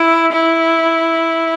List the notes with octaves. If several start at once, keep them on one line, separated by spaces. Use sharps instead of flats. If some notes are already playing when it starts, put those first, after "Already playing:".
Already playing: E4
E4